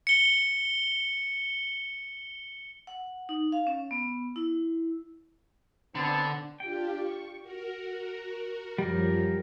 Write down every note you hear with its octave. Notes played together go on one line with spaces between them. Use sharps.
C#7 G7
F#5
D#4
F5
C#4
B3
E4
D3 B3 C4 A5
D4 F4 G4 G5
C#6
F#4 A#4
F#2 F3 G3 A#4